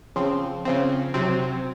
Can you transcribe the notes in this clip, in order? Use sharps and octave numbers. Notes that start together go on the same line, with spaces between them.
C#3 F3 C4
C#3 F3 C4
C3 F#3 C4